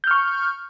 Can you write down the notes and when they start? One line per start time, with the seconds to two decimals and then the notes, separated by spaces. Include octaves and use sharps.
0.04 G6
0.07 F6
0.11 C#6